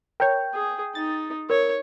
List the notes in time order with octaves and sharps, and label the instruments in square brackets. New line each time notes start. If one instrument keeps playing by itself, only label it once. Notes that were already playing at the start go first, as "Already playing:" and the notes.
[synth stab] A#4 C#5 [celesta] G5 G6
[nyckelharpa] G#4
[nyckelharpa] D#4 [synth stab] A6
[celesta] A#4 [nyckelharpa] C#5